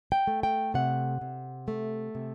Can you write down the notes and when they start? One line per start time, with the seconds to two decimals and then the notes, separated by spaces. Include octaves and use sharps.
0.12 G5
0.27 A3
0.43 G5
0.74 C3 F#5
1.21 C3
1.68 A3
2.15 C3